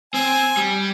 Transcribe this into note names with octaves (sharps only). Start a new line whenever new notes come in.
C4 G#5
G3